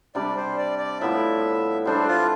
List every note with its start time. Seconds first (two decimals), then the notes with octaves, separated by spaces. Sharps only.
0.15 C3 G3 D4 G4 D5
0.37 C5
0.58 D5
0.79 D5
1.01 A2 F3 B3 E4 E5
1.86 G3 D4 A4 C5
2.07 F4